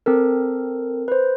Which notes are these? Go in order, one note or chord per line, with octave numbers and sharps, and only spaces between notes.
C4 A4 A#4
B4 C5